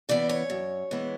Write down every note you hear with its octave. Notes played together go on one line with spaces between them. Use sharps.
C#3 E3 B3 D5
C#5
F#2
E3 G#3 B3